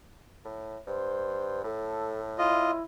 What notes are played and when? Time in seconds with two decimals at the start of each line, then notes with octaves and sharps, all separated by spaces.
0.45 A2
0.87 G2 C5
1.64 A2 A4
2.38 E4 F4 D#5